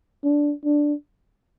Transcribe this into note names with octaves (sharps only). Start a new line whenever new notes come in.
D4
D4